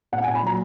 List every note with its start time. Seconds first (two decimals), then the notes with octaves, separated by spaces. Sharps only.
0.12 A#2 F#5
0.24 G#5
0.27 A#2
0.35 B5
0.42 F#3 A#5